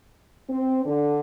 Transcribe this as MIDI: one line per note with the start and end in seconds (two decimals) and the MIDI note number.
0.49 0.85 60
0.85 1.20 50